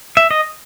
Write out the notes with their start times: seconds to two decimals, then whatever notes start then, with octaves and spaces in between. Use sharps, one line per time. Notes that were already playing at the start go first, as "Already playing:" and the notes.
0.17 E5
0.31 D#5